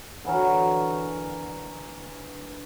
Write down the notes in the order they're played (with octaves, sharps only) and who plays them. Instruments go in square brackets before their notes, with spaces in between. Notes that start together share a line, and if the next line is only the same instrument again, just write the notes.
[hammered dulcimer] D3 E3 F#3 A#4